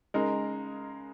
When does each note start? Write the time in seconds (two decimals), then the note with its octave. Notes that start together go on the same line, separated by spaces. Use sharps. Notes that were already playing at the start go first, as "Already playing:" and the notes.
0.14 C#3 G#3 D#4 A#4